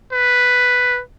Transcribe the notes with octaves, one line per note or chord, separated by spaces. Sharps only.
B4